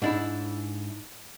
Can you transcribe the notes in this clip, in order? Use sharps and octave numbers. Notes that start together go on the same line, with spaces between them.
G#2 D4 E4